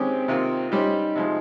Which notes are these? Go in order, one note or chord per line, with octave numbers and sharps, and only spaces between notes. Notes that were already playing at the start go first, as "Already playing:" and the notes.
Already playing: D#3 G#3 C4 C#4 G4
C3 D#3 A#3 F4
G3 C#4 D#4 G4 C5
C3 F3 G#3